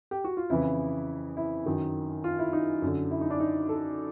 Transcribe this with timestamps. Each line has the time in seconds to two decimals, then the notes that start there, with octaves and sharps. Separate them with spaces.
0.11 G4
0.24 F#4
0.37 F4
0.50 F2 C#3 E3 E4
1.37 E4
1.66 F#2 D#3
2.24 F4
2.39 E4
2.53 D#4
2.82 F#2 D3
3.11 E4
3.21 D#4
3.30 D4
3.40 D#4
3.69 A4